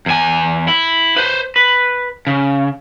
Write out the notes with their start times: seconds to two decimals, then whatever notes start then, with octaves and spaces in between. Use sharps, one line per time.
0.06 E2 G#5
0.68 E4
1.16 B4 C5
1.56 B4
2.27 C#3